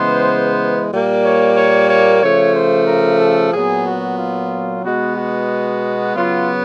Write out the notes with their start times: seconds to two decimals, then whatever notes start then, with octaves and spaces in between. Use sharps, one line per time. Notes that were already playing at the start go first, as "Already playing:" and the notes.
Already playing: C#3 E3 G#3 B3 C5
0.91 A#2 G3 A#3
1.24 C#5
1.55 C#5
1.89 C#5
2.22 C#3 F3 A3 C#5
2.55 C5
2.87 A#4
3.20 A4
3.52 A#2 F#3 B3 G#4
3.86 F#4
4.18 F4
4.83 B2 G#3 B3 F#4
5.17 F#4
6.15 C#3 F#3 B3 F4